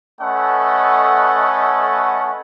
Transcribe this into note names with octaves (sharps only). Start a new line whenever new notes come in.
A3 C#4 A4 B4 D#5 F#5